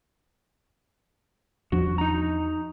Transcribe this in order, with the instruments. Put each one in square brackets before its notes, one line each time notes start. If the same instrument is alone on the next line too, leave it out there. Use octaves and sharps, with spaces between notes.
[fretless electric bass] E2 F3 D4 [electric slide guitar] F#4
[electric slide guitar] D#4 A#5